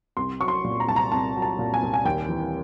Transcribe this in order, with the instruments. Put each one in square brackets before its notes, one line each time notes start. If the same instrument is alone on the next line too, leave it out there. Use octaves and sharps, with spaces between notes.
[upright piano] C2 C6
F#3 C#6
C6
A#2
A#5
C2 A5
A#5
C2 A5
F#3
A5
A#2
G#5
C2
G#5
D#2 G5
E3